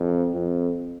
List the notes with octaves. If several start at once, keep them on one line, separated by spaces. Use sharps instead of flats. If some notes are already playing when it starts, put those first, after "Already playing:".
Already playing: F2
F2